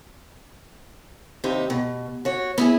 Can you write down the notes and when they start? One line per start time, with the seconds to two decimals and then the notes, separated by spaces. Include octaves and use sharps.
1.44 D#2 C3 D#4 B4 C5
1.70 B2
2.25 F#4 C#5
2.58 B3 E4 G#4